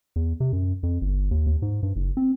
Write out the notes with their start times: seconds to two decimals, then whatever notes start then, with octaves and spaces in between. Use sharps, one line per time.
0.16 E2
0.40 C3
0.53 F#2
0.83 F2
1.01 G1
1.31 D#2
1.47 D#2
1.62 G#2
1.83 G2
1.96 F#1
2.17 C4